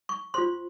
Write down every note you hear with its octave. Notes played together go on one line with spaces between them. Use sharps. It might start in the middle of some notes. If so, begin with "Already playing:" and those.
C#6
F4 C5 C6